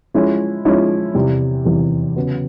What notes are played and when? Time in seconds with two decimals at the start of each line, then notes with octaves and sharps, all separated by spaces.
0.14 F3 G#3 C#4 E4
0.65 F3 G#3 C#4 E4
1.14 E2 C3 E3 G3
1.65 E2 C3 E3 G3
2.16 C#3 F#3 B3